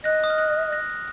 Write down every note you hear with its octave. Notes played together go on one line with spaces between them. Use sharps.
D#5 F#6 A#6
D#6
F6
F#6
F#6 A#6